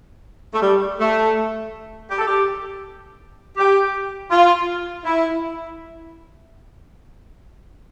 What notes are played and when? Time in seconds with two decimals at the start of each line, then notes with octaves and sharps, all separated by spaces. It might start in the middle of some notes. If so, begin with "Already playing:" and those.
0.53 A3
0.61 G3
0.99 A3
2.10 G4
2.18 A4
2.27 G4
3.57 G4
4.30 F4
5.05 E4